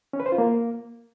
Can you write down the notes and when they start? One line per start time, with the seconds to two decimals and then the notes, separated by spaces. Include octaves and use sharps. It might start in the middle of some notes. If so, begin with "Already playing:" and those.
0.13 C#4
0.20 B4
0.26 C5
0.32 F4
0.38 A#3